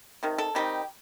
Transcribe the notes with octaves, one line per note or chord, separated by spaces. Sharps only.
C3 D#3
A4
D#3 G3 C4 D#4 G4